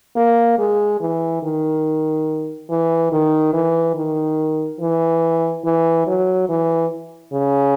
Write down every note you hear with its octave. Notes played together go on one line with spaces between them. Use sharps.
A#3
G#3
E3
D#3
E3
D#3
E3
D#3
E3
E3
F#3
E3
C#3